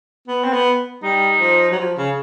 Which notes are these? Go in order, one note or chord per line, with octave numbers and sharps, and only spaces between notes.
B3
C4
B3
G3 D#4
F3
F#3
F3
C#3